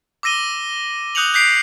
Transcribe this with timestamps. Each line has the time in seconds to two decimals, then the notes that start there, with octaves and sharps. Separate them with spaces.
0.23 D6 E6 A#6 D#7 G7
1.15 D#6 F#6 G6 C#7 F7 F#7
1.34 F#6 G6 B6 C7 D7 F7